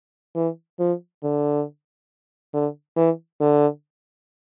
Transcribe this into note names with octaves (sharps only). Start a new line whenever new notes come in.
E3
F3
D3
D3
E3
D3